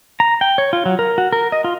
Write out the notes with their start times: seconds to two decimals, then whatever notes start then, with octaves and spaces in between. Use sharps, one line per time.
0.20 A#5
0.41 G5
0.58 C#5
0.73 F4
0.86 F#3
0.99 A#4
1.18 F#4
1.32 A#4
1.52 D#5
1.64 F4